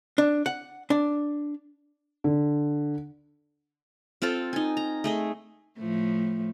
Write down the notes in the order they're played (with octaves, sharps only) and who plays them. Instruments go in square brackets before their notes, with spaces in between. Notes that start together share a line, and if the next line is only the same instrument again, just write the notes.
[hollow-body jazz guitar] D4
F#5
D4
[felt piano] D3
[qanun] C4 F4 A4 F5
D#4 G#5
A#5
A3 G#4 D#5
[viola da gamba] A2 F3 A3